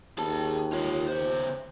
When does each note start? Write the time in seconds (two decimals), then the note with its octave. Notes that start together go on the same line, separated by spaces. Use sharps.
0.18 D#2 G#4 A5
0.73 F4 C#5
1.08 C#3 C5